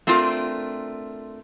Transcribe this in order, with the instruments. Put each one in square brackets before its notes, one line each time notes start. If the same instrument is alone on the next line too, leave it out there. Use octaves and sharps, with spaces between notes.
[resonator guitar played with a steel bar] A3 C4 D4 F4 A#4